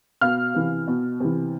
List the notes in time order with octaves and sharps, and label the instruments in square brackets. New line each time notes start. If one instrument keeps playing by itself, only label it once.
[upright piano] B2 F5 F6
C3 E3
B2
C3 E3